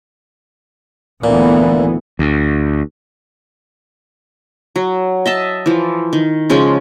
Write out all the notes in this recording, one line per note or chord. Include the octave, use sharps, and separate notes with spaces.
D2 A#2 E3 B3
D2
F#3
D#5 E5 A5
E3 F3
D#3
C#3 F3 G#3 C#4